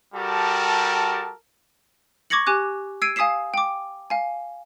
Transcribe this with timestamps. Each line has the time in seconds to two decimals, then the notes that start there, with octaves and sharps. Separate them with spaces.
0.14 G3 F#4 G4 A4 A#4 A5
2.30 C#6 D6 G#6 A#6 C#7 F#7
2.47 G4 G#5 D6 F#6
3.02 E6 G#6 C7 D7 D#7
3.16 F5 G#5 D#6 B6 C7 E7
3.54 G5 D6
4.10 F5 G#5